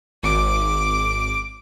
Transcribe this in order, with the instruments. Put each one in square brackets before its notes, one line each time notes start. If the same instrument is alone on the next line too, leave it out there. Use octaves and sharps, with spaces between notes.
[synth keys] G#1 [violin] D6 D7